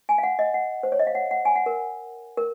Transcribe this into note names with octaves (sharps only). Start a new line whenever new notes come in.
G#5
F5
F#5
D#5
F#5
C5
C#5
D#5
F5
F#5
F#5
G#5
F#5
A#4
A#4